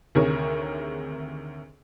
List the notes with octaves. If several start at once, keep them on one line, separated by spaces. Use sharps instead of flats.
D2 C3 D#3 G#4 A#4 C#5